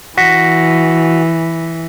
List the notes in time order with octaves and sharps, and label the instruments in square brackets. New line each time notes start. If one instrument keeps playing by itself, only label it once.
[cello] E3 [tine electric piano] F#4 [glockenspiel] A#6 B6 C#7